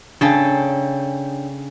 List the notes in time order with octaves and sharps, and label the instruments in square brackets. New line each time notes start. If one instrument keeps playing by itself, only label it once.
[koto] C#3 A4 [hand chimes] D4 C#5 G5